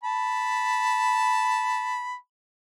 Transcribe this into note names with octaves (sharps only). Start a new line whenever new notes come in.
A5 B5